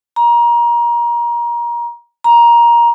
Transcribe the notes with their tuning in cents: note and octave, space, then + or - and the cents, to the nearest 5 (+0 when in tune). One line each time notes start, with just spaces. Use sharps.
A#5 +25
A#5 +15